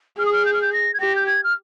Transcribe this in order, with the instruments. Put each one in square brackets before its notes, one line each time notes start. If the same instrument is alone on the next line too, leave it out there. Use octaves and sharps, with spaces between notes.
[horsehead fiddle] G#4 [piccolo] F6
[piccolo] D#6
F6
G6
F6
G6
A#6
G#6
[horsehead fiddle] G4 [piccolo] A#6
[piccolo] G6
G#6
F6